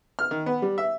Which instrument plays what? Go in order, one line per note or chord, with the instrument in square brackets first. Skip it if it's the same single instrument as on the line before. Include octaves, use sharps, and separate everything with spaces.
[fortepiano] F6
D#3
B3
G3
E5